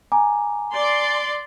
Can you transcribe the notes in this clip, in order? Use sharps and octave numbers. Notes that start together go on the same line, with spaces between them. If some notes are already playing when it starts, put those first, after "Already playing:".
G#5 A#5 D6
D5 C6